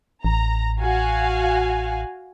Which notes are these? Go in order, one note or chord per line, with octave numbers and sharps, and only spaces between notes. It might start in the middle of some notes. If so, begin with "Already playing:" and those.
A1 A#5
F#4 F5 G#5